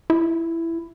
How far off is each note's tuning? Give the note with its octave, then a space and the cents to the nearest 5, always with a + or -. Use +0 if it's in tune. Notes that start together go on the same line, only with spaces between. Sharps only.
E4 +10